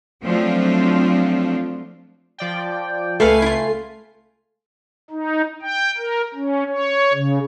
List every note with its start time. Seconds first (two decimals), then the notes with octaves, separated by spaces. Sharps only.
0.24 F3 F#3 A3 C4 D4 F4
2.38 F3 D5 G5
3.20 C#2 A3 A4 B4 F5 G#5 C7
3.42 E4 F4
5.10 D#4
5.62 G5
5.97 A#4
6.34 C#4
6.68 C#5
7.13 C#3